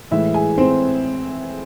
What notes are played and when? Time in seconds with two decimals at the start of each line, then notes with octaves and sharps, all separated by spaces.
0.11 A2 E3 G#3 E4 E5
0.34 G#4 G#5
0.58 C4 C5